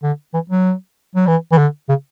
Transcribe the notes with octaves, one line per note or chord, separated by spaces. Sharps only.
D3
E3
F#3
F#3
E3
E3
D3
C#3